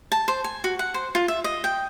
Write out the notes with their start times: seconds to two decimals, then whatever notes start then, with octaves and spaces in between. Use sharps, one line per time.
0.12 A5
0.28 C5
0.44 G#5
0.64 F#4
0.79 F#5
0.94 C5
1.15 F4
1.28 E5
1.44 D#5
1.64 G5